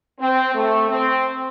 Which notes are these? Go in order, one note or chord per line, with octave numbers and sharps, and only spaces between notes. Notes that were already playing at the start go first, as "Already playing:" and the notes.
C4
A3
C4